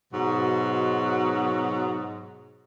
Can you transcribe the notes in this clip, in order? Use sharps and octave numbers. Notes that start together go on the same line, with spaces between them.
G#2 B2 F#3